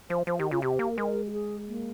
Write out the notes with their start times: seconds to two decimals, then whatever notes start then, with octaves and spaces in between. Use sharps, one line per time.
0.10 F3 C5
0.27 F3 C5
0.39 D#3 G4
0.51 C#3 F4
0.62 C3 G4
0.79 A#3
0.97 G#3 A#4
1.27 G4
1.32 G#4
1.67 A#3